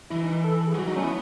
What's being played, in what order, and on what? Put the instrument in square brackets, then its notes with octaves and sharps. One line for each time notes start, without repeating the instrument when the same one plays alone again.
[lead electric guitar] E3 [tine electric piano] E4
[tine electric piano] D#4
A4
G#4
[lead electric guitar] F#3
[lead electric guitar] E3 [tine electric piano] F#4
[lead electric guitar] F#3 [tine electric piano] D#4
[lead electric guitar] A3 [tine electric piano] C#4
[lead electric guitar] B3 [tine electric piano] E4